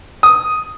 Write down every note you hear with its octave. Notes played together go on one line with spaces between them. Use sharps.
D#6